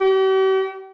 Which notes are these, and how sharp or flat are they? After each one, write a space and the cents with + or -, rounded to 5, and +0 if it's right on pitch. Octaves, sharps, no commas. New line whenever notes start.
G4 -45